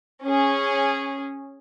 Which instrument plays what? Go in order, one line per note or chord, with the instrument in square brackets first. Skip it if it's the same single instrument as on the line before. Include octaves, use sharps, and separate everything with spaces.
[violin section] C#4 G#4